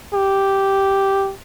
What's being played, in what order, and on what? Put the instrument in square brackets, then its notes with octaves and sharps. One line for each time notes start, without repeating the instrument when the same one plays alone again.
[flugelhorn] G4